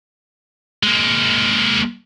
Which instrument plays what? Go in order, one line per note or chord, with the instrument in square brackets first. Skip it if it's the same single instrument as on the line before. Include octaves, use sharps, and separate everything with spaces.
[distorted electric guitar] G#3 A#3